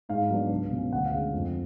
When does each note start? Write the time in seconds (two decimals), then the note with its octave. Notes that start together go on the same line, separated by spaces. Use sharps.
0.09 G#2 F5
0.30 F#3 B3 D4
0.51 C#2
0.71 B2 F#3 C#4
0.92 D2 F#5
1.06 F5
1.13 C#3 G#3 D4
1.33 F2